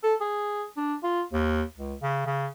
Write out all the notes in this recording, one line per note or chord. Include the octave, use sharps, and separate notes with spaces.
A4
G#4
D4
F4
D#2
C#2
C#3
C#3